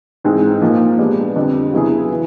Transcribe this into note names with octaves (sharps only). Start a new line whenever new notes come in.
G#2 E3 G#3 C4 D#4
A#2 F3 A#3 D#4
G#3 B3 D4 G4
F2 D3 G3
C#3 F#3 B3 E4 G#4
E3